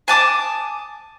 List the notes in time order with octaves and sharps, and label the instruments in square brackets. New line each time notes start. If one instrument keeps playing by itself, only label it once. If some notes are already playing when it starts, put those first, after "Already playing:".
[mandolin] G#5 A5 D6 D#6